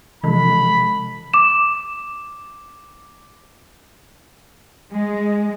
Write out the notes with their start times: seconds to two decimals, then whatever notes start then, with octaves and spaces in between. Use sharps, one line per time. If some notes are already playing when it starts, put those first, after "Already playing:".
0.24 C3 E3 F3 G#3 B5
1.34 D6 E7
4.92 G#3